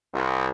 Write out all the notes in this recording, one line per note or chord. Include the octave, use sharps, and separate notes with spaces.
C2